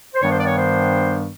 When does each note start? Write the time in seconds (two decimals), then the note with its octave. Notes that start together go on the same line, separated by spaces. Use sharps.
0.15 C5
0.21 G2 D#3 G3 B3 D4 C#5
0.31 C5
0.39 D5
0.46 C#5
0.56 C5